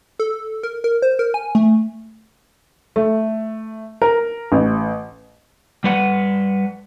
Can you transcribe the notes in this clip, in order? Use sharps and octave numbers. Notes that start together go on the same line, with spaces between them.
A4
A#4
A#4
C5
A#4
G#5
A3
A3
A#4
A1
G3 B4 F#5